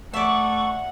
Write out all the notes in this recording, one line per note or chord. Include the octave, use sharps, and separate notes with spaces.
A3 D5 E5 F#5 C#6